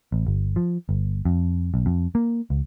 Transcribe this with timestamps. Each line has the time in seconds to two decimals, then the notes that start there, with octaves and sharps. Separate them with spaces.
0.12 A1
0.27 G1
0.56 F3
0.89 G1
1.25 F2
1.74 B1
1.86 F2
2.15 A#3
2.50 C#2